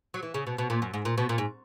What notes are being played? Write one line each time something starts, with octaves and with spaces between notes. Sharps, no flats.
F#3
E3
C#3
B2
B2
A#2
F#2
G#2
A#2
B2
A#2
G#2